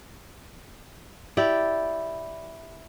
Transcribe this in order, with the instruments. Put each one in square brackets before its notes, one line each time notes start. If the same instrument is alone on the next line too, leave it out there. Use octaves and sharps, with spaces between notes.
[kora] E4 G4 D5